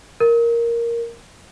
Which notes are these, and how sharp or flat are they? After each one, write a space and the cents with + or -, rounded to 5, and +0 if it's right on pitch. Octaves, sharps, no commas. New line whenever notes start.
A#4 +0